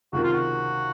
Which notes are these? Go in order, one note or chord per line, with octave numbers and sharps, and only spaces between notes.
C#2 C3 D#3 F#4
F4
F#4